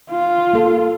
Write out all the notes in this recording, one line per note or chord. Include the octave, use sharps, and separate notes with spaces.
F4
A#3 A4